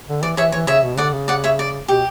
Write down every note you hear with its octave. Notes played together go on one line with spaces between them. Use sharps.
D3
E3 D5
E3 C#5 E5
E3 C#5
C#3 C#5 E5
B2
D3 D5 F#5
C#3
D5 F#5
C#5 E5
D5
B2 G4